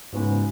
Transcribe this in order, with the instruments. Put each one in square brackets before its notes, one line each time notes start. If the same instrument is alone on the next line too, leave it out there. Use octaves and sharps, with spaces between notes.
[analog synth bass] G#2 [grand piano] C#3 G#3 B3 D#4 F#4